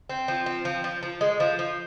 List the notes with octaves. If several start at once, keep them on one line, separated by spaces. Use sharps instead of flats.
C4
F3
C4
F3
F3
F3
G#3
F3
F3